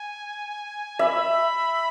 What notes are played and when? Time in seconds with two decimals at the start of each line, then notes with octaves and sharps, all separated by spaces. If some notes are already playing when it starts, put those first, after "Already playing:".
Already playing: G#5
0.99 E5 B5